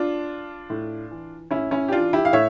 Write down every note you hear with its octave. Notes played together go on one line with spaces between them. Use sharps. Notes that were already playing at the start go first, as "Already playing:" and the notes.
Already playing: D4 F4
A2
E3
A2 C#4 E4
C#4 E4
G4
E3 D4 F4
E4 G4
F5
A2 C#5 E5